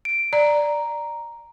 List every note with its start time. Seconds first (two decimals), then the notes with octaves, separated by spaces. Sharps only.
0.05 D7
0.33 D5 A#5